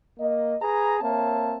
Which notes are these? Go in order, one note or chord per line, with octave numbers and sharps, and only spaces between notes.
A#3 D#5
G#4 B4 A#5
A#3 C4 C#5 E5 A5